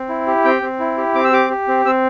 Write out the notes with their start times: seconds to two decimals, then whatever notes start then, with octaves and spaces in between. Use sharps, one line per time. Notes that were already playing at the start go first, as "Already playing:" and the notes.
Already playing: C4
0.09 E4
0.27 G4
0.44 C4 G5
0.62 C4
0.79 E4
0.97 G4
1.15 C4 D6
1.24 E6
1.32 G4 D6
1.50 G4
1.68 C4
1.85 C4 E6